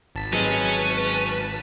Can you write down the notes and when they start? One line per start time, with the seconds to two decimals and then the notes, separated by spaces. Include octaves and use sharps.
0.15 G#1 A5 B6
0.33 F#3 G#3 C4 C#4 B4